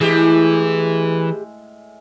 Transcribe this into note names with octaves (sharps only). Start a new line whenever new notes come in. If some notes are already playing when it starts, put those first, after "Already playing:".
A2 E3 G#3 G4 G#4